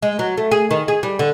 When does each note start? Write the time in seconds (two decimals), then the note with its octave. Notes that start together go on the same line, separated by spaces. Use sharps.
0.03 G#3
0.19 F#3
0.38 A3
0.51 G#4
0.71 D#3
0.88 G#4
1.03 G3
1.19 D3